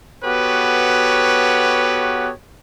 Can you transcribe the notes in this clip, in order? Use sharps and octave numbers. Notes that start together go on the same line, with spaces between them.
B3 F#4 G4 A4 B4 C#5